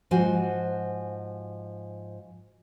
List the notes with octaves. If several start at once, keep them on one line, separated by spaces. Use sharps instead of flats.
G#2 F3 F#4 C5 G#5